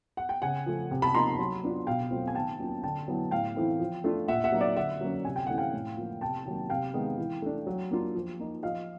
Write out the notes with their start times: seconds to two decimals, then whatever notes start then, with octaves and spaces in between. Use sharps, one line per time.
0.17 F#5
0.29 G5
0.42 C#3 F#5 G#5
0.66 F3 A3
0.91 C3
1.02 A5 B5
1.14 F3 A#3 D#4 A#5 C6
1.39 F#3
1.63 B3 D4 F4
1.87 B2 F5 G5
2.11 F#3 A3 C4 F4
2.28 G#5
2.35 D#3 G5 A5
2.60 F#3 A#3 C#4 F4
2.83 D3 G5 A5
3.08 F#3 B3 E4
3.31 A2 F5 G5
3.56 E3 A3 C4 E4
3.80 F3
4.04 A3 D4 F4
4.28 A#2 E5 F#5
4.44 E5 F#5
4.52 F#3 A#3 D#4
4.60 D5 E5
4.76 D3 E5 F#5
5.01 F#3 A#3 C#4
5.25 C3 G#5
5.36 G5
5.47 E3 A3 C#4 F#5
5.58 F5 G5
5.73 A2
5.97 F3 A#3
6.21 C3 G5 A5
6.45 D#3 F#3 A#3
6.70 C3 F5 G5
6.94 D#3 G#3 B3
7.18 E3
7.42 A3 D4
7.67 F#3
7.91 A#3 D4 F4
8.15 F3
8.39 A#3 D#4
8.63 F3 D#5 F5